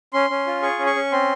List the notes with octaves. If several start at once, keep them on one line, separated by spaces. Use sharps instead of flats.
C#4 C6
C#4
F4
G#4 C#6
C#4
C#6
C#4
C4 C6